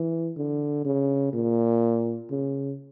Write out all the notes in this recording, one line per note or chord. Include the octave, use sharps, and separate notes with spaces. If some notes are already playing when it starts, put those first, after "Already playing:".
Already playing: E3
D3
C#3
A#2
C#3